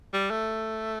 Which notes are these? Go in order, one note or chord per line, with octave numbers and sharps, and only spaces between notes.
G3
A3